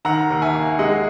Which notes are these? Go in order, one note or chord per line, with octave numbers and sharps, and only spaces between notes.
D#3 F#5 A#5
D#2
E5 G#5
A#3
G#3 D#5 F#5